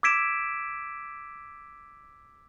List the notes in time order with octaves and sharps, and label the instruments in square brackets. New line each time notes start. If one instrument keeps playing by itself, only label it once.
[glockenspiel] D6 E6 G#6 B6 D7 E7